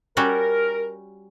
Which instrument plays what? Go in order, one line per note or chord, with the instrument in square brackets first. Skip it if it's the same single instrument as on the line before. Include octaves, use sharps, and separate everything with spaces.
[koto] G3 C#4 F#4 [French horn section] A#4